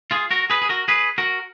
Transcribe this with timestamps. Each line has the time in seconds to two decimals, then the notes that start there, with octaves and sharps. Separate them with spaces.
0.11 F4 G#4
0.31 F#4 A#4
0.50 G#4 B4
0.62 G#4
0.69 F#4 A#4
0.88 G#4 B4
1.18 F#4 A#4